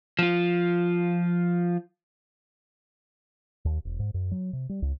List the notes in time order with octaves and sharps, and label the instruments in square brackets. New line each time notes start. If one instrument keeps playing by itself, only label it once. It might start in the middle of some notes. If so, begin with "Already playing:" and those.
[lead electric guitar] F3 F4
[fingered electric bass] D#2
E1
G#2
F#2
F#3
C3
G3
C#2